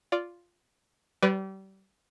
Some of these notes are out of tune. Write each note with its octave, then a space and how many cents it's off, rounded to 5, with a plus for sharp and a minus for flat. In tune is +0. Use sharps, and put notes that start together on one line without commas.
F4 +0 D5 -10
G3 -30 B4 +20 D5 -15